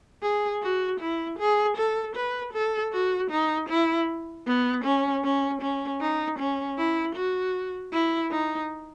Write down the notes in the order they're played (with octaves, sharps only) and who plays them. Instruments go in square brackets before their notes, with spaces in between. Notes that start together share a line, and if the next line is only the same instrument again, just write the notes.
[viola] G#4
F#4
E4
G#4
A4
B4
A4
F#4
D#4
E4
B3
C#4
C#4
C#4
D#4
C#4
E4
F#4
E4
D#4